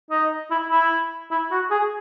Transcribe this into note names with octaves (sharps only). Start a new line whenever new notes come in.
D#4
E4
E4
E4
F#4
G#4